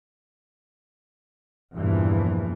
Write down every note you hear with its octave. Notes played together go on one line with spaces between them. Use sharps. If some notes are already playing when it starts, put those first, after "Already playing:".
E2 G2 A#2 E3 F3